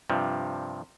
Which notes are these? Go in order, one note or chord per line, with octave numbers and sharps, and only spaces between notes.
G2 C3 F3